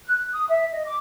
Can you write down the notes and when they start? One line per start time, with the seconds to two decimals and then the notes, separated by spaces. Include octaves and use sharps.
0.06 F#6
0.33 D#6
0.49 E5
0.73 D#5
0.85 D6